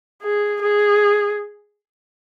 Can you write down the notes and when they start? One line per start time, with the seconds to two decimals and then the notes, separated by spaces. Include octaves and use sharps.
0.24 G#4
0.62 G#4